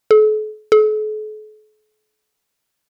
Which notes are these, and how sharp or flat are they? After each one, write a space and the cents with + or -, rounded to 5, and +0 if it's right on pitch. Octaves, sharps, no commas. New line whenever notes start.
A4 -45
A4 -45